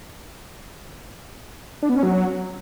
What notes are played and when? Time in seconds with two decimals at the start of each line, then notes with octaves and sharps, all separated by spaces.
1.82 D4
1.89 B3
1.96 C#4
2.03 F#3